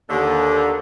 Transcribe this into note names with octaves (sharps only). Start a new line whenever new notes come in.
D#2 D3